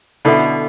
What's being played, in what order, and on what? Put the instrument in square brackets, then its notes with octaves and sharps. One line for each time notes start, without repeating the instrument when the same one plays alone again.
[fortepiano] B2 D3 [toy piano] E4 A4 E5